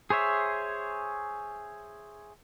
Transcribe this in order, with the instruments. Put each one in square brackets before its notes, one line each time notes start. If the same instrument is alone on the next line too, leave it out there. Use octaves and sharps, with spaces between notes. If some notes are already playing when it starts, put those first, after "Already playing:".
[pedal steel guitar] G#4 C5 C#5 E5